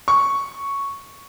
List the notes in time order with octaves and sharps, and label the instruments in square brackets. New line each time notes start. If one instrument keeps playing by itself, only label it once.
[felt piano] C#6